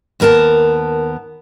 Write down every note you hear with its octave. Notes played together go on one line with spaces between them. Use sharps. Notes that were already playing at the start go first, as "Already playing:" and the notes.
D#2 B3 A#4 G#5 A5